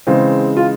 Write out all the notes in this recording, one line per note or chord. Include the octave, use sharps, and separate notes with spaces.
C#3 E3 G#3 C4
F4